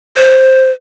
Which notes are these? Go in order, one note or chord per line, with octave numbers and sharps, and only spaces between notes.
C5